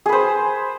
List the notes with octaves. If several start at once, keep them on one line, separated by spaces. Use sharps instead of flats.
G#4 B4 C5